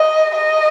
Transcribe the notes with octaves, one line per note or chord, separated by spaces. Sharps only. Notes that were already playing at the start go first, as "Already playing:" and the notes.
Already playing: D#5
D#5